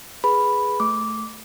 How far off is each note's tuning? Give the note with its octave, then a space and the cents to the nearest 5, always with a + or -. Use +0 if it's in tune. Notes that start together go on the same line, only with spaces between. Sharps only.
G#4 +0 B4 +0 B5 +0
A3 +0 D6 -10